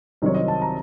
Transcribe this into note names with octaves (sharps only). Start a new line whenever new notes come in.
C2 C3 D#3 F#3 C4 C#5
D#5
A5
A#5